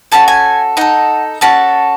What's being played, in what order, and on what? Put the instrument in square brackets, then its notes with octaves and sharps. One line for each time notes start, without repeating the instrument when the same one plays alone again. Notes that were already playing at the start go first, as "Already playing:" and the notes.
[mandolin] C#4 F#4 A4 A5
G#5
D#4 A4 F#5
C#4 F#4 A4 A5